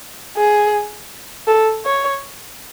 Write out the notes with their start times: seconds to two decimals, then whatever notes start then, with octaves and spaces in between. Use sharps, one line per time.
0.37 G#4
1.47 A4
1.85 C#5